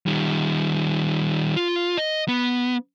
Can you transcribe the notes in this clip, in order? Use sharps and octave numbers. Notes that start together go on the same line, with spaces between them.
D#3 G3
F4
D#5
B3